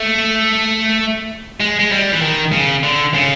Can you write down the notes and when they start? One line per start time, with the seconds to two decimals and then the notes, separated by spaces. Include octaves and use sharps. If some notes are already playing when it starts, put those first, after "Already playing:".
Already playing: A3
1.60 G#3
1.79 G#3
1.92 G3
2.12 E3
2.22 D#3
2.53 C#3
2.83 D3
3.14 C#3